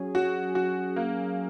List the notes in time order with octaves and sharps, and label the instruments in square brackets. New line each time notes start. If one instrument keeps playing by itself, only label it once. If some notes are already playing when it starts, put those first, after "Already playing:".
Already playing: [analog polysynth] F#3 C#4 G#4
[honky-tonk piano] F#4
F#4
A#3